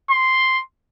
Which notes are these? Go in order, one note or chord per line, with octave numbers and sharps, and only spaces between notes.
C6